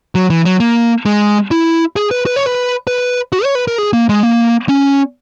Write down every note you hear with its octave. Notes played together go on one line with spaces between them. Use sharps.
F#3
E3
F#3
A#3
G#3
E4
G#4
B4
B4
C#5
B4
B4
F#4
C#5
B4
A#4
G#4
A#3
G#3
A#3
C#4